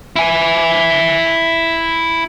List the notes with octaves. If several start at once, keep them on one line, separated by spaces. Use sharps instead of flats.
E4 G#5